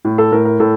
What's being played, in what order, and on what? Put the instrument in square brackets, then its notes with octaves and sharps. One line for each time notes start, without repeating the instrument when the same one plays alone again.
[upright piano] A2
A4
A2 A#4
A#4
A2 A4